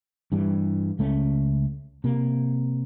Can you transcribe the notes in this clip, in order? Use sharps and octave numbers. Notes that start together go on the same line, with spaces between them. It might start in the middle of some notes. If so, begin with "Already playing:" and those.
G2 E3 G3
C#2 A3 C#4
C3 A#3